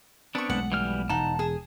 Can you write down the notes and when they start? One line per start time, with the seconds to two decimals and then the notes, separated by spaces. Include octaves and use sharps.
0.35 B3 C4 D4 A5 C#6
0.49 B1 G#3 A3 F#5
0.72 E3 G3 F6
1.10 E1 D#4 F#5 A5
1.39 G#4